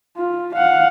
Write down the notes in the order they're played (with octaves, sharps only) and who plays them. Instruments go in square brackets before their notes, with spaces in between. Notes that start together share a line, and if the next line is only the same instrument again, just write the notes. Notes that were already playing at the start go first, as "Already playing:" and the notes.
[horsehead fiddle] F4
F5 F#5